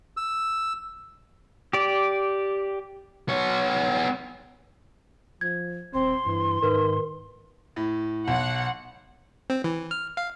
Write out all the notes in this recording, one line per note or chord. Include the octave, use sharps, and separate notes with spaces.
E6
G4 D5
B3 C#5
F3 G#6
D#1 C4 C6
G2 E3
G#2 D#3 A#4 B4
A2
B1 F#5
C4
E3
F6
F5